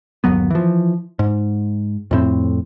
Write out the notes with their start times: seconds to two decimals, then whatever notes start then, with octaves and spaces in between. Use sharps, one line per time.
0.24 G1 D#2 F#3 B3
0.50 E3 F3
1.19 G#2
2.11 F2 A2 C4